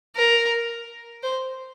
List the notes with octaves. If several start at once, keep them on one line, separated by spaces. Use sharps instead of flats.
A#4
C5